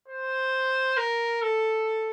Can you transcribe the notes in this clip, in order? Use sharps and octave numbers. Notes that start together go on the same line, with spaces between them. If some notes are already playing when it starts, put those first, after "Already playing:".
C5
A#4
A4